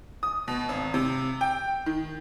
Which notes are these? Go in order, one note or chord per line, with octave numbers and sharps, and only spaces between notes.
D#6
B2
G#1
C3
G5
D#3